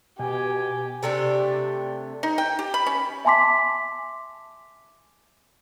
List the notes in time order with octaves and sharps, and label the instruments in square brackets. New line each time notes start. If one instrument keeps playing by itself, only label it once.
[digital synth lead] B2 [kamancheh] G4 [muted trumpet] G#5
[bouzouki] C3 A3 D4 G4
[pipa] D#4
G5
G4
B5
C#4
[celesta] E5 G#5 A5 C6 D6 B6